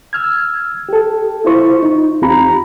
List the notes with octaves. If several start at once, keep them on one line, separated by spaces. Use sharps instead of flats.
E6 F6 G#6
G4 A4
E4 F4 C5 C#6
D#4
E2 C4 F4 G4 A#5 B5